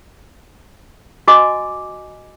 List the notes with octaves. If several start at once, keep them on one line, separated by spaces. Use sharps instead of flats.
F#4 D#5 G#5 D6